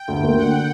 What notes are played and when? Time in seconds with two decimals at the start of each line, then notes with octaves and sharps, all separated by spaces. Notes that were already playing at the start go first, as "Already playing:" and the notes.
Already playing: G5
0.08 D2
0.23 A#3
0.37 D3 F#5